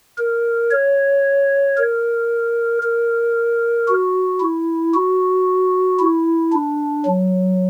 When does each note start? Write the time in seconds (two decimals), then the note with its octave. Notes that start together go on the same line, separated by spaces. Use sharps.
0.18 A#4
0.71 C#5
1.77 A#4
2.82 A#4
3.88 F#4
4.41 E4
4.94 F#4
6.00 E4
6.53 D4
7.06 F#3